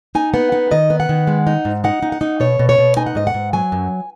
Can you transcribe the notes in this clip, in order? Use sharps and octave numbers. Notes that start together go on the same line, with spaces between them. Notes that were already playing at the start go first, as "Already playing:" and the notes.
D#4 G#5
B3 F#5
D#4 F#5
D#3 D#5
B3
F#5
D#3
G#3
D#4
G#2
D#4 F#5
D#4
F#5
D#4
B2 C#5
B2
C#5
B2
D#4 G#5
F#5
G#2 D#5
F#5
G#2
F#3 G#5
F#2